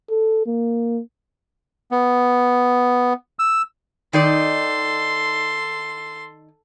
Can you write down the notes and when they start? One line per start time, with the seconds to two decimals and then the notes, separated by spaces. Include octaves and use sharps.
0.10 A4
0.46 A#3
1.91 B3
3.39 E6
4.13 D#3 D#4 A4 D5 C6